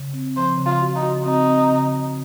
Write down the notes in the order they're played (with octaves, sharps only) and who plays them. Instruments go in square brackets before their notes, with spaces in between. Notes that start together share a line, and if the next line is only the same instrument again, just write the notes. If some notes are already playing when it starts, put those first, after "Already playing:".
Already playing: [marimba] C#3
C4
[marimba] F3 [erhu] C5
[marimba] C#3
[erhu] F4
[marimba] F#4
[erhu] D#4
[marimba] F#4
[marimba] C4 [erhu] D#4
[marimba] C4
C#3
C#3